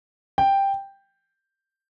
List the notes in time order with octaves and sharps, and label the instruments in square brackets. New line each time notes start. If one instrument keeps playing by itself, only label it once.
[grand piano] G5